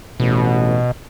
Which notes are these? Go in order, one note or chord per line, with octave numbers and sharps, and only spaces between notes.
A1 B2